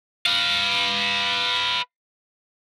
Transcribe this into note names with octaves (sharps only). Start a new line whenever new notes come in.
B4 F5